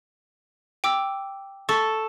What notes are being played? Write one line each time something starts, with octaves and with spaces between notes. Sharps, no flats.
G5 D6 E6
A4 C#6